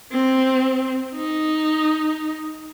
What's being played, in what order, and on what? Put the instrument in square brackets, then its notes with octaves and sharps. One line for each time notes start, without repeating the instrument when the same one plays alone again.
[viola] C4
D#4